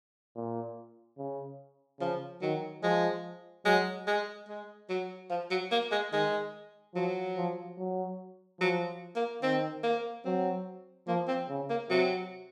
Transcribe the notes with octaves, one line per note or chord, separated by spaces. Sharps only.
A#2
C#3
C#3 F3
D#3 F#3
F3 G#3
F#3 G#3
G#3
G#3
F#3
F3
F#3
A#3
G#3
D#3 G#3
F3 F#3
F3
F#3
F3 F#3
A#3
D#3 C4
A#3
F#3 C4
F3 A#3
C4
C#3
A#3
C3 F#3